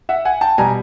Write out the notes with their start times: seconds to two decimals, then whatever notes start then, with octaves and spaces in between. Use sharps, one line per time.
0.09 E5 F#5
0.25 F#5 G#5
0.41 G5 A5
0.58 B2 G3 G#5 A#5